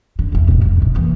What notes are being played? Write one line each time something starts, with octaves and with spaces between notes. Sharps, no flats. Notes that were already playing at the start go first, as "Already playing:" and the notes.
D3
F1 E2
E1 A2
F2
B2
E3 A#3